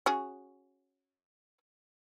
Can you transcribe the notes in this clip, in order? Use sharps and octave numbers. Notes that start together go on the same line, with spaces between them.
C#4 F#4 G#4